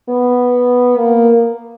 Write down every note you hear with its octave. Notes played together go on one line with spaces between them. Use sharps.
B3
A#3